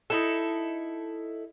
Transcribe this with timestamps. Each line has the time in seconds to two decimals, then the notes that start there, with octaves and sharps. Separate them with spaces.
0.10 D#4 E4 A4